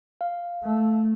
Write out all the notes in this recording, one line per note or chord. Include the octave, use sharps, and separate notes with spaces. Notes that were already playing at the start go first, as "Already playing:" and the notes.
F5
A3